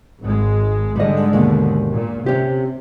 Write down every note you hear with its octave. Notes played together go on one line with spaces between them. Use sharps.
G#1 G#3
G#2 D3 G3 G#3 D#5
D#2 B2
A#2
C3 C#4 G4